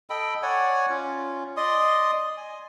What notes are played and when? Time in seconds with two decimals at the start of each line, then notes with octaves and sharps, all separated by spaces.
0.10 A4 D#5 G5 B5
0.42 C#5 D5 F#5 G#5
0.89 C#4 F4
1.57 D5 D#5 C6 D#6
2.37 G#5